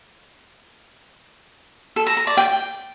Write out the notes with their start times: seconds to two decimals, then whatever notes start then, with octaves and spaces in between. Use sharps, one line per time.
1.96 A4
2.07 A#5
2.17 A#5
2.27 D5
2.37 G5